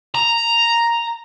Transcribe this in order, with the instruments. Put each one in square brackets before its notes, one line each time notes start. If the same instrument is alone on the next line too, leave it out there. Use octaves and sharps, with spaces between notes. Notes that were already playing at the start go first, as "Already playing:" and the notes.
[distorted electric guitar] A#5